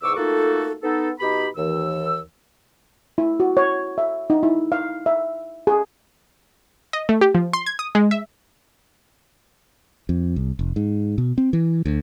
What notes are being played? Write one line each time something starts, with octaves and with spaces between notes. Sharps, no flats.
E2 G#2 C#6 D6 E6
A3 A#3 D#4 F4 F#4 A4
B3 D#4 A4
B2 D#4 G4 B5
D#2 E3 E6
E4
F#4
C#5
E5
D#4
E4
F5
E5
G#4
D#5
A3
G4
F3
C6
G#6
D#6
G#3
E5
F2
C2
F1
G#2
B2
C4
E3
D2